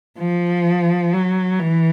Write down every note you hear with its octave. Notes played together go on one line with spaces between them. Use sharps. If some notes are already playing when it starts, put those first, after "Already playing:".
F3
F#3
E3